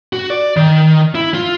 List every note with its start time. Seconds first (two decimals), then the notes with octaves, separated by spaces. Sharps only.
0.13 F#4
0.30 D5
0.57 D#3
1.15 E4
1.34 F4